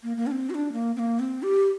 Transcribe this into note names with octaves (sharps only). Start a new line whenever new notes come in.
A#3
A#3
D4
C4
F#4
D4
A#3
C4
A#3
C4
G4